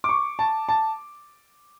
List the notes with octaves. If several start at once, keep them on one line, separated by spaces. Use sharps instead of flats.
D6
C#6
A5
A5